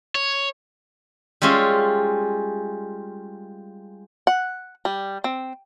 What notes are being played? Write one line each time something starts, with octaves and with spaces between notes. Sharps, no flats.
C#5
G3 G#3 C#4 F4 E5
F#5
G3
C4